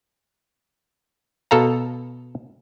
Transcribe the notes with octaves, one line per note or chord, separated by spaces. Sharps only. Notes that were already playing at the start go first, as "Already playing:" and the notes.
B2 A4 F5 A#5